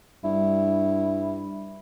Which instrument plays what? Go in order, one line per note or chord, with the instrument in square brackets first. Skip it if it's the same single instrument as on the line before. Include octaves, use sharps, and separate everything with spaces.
[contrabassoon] G2 [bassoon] E4